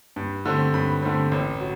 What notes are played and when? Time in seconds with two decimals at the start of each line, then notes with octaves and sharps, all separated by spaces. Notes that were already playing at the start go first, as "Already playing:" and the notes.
0.16 G2
0.46 D3 A3 C4
0.74 G2 B5
1.02 D3 A3 C4
1.31 A1
1.60 F#3